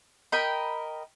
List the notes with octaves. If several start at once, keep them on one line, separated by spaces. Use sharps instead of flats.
A#4 D#5 G5 B5